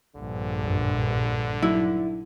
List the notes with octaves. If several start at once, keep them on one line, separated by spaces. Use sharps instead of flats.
A#1 G2 D3
F#2
F#3 D#4 E4